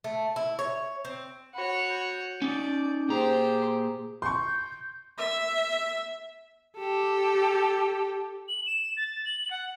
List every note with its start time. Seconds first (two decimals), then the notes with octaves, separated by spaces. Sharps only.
0.04 A3
0.36 E4
0.59 C#5
1.05 C4
1.54 F#4 C#5 B5
1.90 G6
2.42 C#4 D#4 D5
3.09 A#2 G4 G#4 C5 A#5
4.22 C6 C#6 G6
5.18 E5
6.78 G4 A4
8.48 F#7
8.66 E7
8.97 A6
9.25 F#7
9.51 F#5